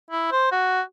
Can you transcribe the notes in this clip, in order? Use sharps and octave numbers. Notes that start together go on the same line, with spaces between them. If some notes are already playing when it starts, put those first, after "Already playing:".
E4
C5
F#4